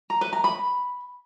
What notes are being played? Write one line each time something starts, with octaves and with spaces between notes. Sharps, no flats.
A#5
B4
A#5
B5